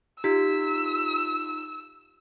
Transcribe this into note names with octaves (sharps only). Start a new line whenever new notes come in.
D#4 F4 G4 E6 B6